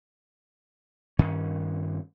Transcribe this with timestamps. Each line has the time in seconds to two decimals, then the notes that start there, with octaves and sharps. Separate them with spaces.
1.19 G2 D#3 C#4